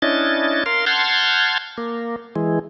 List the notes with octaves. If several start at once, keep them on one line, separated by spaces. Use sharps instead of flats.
C#4 D4 E4 D#5 A6
A#4 F5 C6
F#5 A5 C6 F6 G6 G#6
A#3
E3 G#3